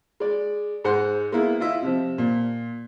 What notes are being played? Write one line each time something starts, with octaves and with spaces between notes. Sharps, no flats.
G#3 D5
G#2 G#3 C5 F#5 C6
G#3 A#3 B3 E4
E4 F4 D#5 E5
C3 F3
A#2